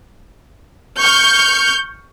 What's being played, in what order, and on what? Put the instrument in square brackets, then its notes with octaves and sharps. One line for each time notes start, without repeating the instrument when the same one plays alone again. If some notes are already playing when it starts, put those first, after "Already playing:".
[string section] C#6 F6 G6 C#7